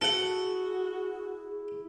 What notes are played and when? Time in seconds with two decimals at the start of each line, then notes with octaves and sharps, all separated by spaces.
0.01 E4 F#4 G#4 A4 F#5